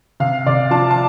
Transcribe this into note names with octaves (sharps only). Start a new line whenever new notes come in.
C3 F5
C3 D5
F3 A5
A5